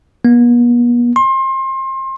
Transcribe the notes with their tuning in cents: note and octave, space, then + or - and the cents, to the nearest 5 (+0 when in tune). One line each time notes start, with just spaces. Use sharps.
B3 -45
C6 +30